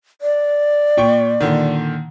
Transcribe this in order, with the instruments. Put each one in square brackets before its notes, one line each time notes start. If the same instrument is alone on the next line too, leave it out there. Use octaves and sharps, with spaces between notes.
[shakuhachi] D5
[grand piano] A#2 G5 C#6
A#2 D3 D#3